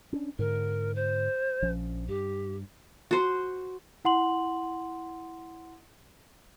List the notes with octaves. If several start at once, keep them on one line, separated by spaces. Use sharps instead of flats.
C#4 D4
G#2 D3 A#4
C5
A#1 F3 C#4
G2 G4
F#4 C5
E4 F#5 C6 F#7